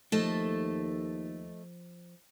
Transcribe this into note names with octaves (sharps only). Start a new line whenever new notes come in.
D#2 F3 A3 A4 D#5